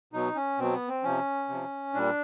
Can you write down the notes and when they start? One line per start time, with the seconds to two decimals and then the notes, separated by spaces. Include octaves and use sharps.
0.13 B2 F#3 D#4
0.36 C#4
0.59 B2 F#3 C4
0.73 B3
0.89 C4
1.04 C3 F3 C#4
1.49 C3 F3
1.94 A#2 G3 D4